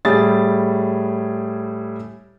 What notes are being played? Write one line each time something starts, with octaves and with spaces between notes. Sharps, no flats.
A2 G3 G#4 A6